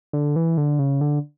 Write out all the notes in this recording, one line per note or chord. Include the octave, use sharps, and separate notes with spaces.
D3
E3
D3
C#3
D3